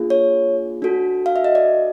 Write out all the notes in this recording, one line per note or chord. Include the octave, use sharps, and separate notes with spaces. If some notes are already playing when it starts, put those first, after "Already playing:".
Already playing: A#3 D4 F4 G#4
C#5
D4 F#4 A4
F5
E5
D#5
D5